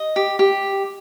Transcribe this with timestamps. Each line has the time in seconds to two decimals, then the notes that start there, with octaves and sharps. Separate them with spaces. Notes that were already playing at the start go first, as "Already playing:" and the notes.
Already playing: D#5
0.16 G4
0.39 G4